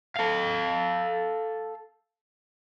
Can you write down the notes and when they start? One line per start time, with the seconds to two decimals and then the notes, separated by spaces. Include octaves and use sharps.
0.16 A4 F5